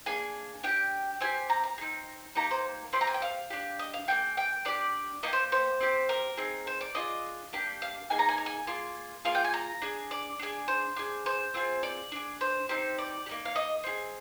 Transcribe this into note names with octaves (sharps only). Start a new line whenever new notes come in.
A#3 D4 G#4 G#5
D4 G4 G5
C4 G4 G#5
A#5
A#5
G#4
C4 D#4
A#3 D#4 G4 A#5
C5
C4 G4 C6
A#5
G#5
G5
F5
D4 G4
D#5
F5
A#3 F4 G#4 G5
G5
D4 G4 D5
A#3 D#4 G4 D#5
C5
C5
C4 G4
A#4
C4 D#4 G#4
C5
D5
D4 F4 G#4 D#5
A#3 D4 G4
F5
A#3 D#4 G#4 G#5
A#5
G#5
A#5
G#5
A#3 F4 G#4 C6
A#3 F4 G#4 F5
G5
G#5
A#5
D4 G#4
D5
D4 F4 G#4
C5
D4 G#4
C5
C4 F4 G#4
D5
D4 G#4
C5
C4 D#4 G4 C5
D5
G4
A#3 D#4
F5
D#5
C4 F4 G#4